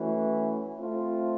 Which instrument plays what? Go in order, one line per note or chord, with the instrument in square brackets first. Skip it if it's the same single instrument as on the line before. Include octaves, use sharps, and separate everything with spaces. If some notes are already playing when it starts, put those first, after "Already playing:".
Already playing: [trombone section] E3 A3 C#4 F#4
A3 C4 F4